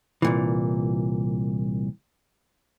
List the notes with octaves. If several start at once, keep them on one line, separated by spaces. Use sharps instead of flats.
C2 A#2 E3